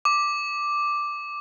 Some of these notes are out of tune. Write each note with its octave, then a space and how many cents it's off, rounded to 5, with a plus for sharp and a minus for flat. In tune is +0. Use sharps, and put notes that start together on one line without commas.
D6 +0